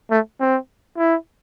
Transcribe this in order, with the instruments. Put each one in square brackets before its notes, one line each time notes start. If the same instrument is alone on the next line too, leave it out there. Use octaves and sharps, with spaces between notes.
[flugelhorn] A3
C4
E4